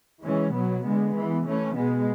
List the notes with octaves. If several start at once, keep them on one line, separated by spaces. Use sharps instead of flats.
E3 G#3 C#4
B2 F#3 B3
D3 G#3 B3
E3 B3
E3 A3 C#4
B2 G#3 B3